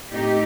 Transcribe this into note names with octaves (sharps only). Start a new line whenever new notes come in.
A2 A3 C4 D#4 G4